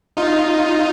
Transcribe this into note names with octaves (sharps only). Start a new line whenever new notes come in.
D#4 F4